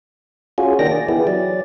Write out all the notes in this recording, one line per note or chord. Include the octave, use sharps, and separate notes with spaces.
C#4 F4 F#4 G#4
D#3 A#3 D4 D#5 G5 A#6
D5
E3 B3 E4 G4 G#4
F#3 D5